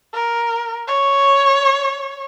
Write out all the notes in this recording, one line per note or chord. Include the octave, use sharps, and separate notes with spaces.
A#4
C#5